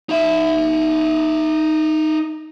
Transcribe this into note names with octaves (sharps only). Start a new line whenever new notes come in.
D#4 E5